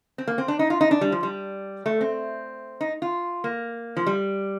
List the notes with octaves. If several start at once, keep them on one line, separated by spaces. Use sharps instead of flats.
C4
A#3
C4
D4
D#4
F4
D#4
D4
G3
F3
G3
A3
C4
D#4
F4
A#3
F3
G3